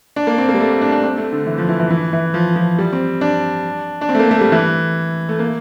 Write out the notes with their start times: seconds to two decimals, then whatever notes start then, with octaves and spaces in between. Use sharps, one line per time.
0.16 D4
0.27 A#3
0.38 C4
0.49 A#3
0.54 G3
0.60 A3
0.71 C4
0.81 D4
0.92 D4
1.03 C4
1.18 A3
1.33 D3
1.47 E3
1.58 F3
1.69 E3
1.80 E3
1.90 E3
2.13 E3
2.34 F3
2.56 F3
2.79 G3
2.93 C4
3.21 D4
4.01 D4
4.09 C4
4.15 A3
4.19 A#3
4.31 A3
4.41 G3
4.52 E3
5.29 A3
5.39 A#3